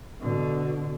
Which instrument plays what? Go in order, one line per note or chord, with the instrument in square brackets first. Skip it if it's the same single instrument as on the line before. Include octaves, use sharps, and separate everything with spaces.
[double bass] B2 D3